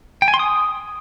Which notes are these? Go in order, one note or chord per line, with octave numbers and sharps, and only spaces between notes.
G5
G#5
C6
D#6